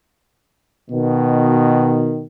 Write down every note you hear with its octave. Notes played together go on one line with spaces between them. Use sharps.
B2 D#3